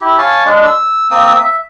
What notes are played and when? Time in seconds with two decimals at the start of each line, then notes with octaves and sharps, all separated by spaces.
0.01 E4 G4
0.18 C#5 F5 G#5 A5
0.45 G#3 D4
0.65 E6
1.11 A#3 C4 D#6 E6
1.39 E5